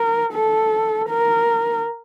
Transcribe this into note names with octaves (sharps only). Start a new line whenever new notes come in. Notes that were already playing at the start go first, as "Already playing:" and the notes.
Already playing: A#4
A4
A#4